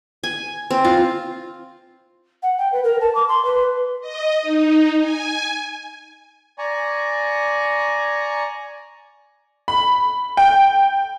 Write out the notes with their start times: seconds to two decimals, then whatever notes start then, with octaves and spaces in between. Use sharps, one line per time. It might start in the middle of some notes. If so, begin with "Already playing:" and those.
0.24 G#5
0.70 C4
0.85 F4
2.42 F#5
2.58 G5
2.72 B4
2.84 A#4
3.01 A5
3.15 D6
3.28 C6
3.44 B4
4.01 D#5
4.42 D#4
4.99 G#5
6.58 D5 G#5 A#5 C#6
9.68 B5
10.37 G5